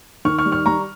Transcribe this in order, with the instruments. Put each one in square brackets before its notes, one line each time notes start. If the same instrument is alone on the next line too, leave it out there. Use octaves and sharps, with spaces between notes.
[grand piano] D#3 C#6 F6
C#6 F6
G3
C#6 F6
G3 A#5 C#6